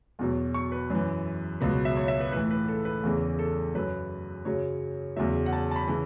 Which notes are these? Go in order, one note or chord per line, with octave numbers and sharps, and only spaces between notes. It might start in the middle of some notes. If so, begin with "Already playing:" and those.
E2 B2 F#3
C#6
B4
F#2 E3
C#2 B2 F#3 B4
E5
C#5
E5
B4
A2 E3 B4
B4
A4
B4
E2 C#3 E3
A4
F#2 F#3 B4
F#2 C#3 F#3 C#5
E2 C#3 F#3 E5
F#5
A5
A5
B5
C#3 E3